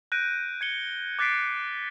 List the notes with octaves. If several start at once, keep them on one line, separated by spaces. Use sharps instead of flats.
F#6 G6 A#6 D7 D#7
G#6 C#7 G7
D6 F#6 A6 B6 C7 D7